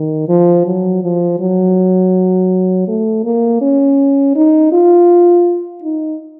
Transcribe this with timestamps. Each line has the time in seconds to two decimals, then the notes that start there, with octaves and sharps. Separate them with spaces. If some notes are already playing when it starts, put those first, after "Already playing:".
Already playing: D#3
0.28 F3
0.66 F#3
1.03 F3
1.40 F#3
2.88 A3
3.24 A#3
3.61 C#4
4.36 D#4
4.73 F4
5.83 D#4